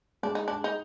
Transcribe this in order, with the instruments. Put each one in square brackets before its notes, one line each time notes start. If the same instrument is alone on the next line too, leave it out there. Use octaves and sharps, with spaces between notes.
[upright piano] G#3 [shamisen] D4
[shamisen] D#4
[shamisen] D4 [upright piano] G#4
[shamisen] D#4